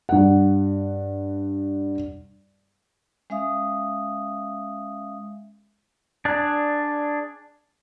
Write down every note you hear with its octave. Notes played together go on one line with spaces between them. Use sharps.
G2 F#5
G#3 C#4 E5 F5 D#6
D4 G#4 D5 F#6